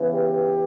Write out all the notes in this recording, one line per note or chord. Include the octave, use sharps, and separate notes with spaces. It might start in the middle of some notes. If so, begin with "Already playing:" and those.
Already playing: C#3 E3 B3
G4